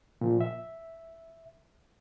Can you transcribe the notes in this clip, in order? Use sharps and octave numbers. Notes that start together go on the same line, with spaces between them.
A#2 F3
E5